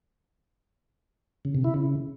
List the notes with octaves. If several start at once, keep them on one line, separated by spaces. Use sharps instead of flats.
C#3
C3
E4
C#3